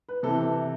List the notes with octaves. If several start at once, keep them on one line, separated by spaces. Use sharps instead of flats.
B4
C3 E3 A4